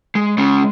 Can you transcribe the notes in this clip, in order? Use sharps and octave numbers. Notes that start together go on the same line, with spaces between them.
G#3
G#3 C#4